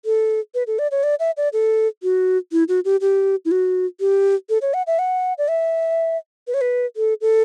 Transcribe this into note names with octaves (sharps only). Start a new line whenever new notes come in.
A4
B4
A4
D5
C#5
D5
E5
D5
A4
F#4
E4
F#4
G4
G4
E4
F#4
G4
A4
C#5
F#5
E5
F#5
D5
E5
B4
C#5
B4
A4
A4